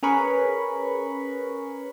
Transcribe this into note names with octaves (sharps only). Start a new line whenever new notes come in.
C#4 G#4 A#4 B4 B5 C#6